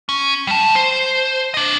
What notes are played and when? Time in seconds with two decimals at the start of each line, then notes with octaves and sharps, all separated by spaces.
0.09 C#4
0.47 G3 A5
0.75 C5
1.54 D4 D#5